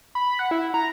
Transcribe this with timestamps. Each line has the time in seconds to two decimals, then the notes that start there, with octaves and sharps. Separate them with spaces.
0.15 B5
0.39 F#5
0.51 E4
0.74 A#5